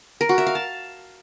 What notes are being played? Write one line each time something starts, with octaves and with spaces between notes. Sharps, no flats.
A#4
F#4
E5
F5
A5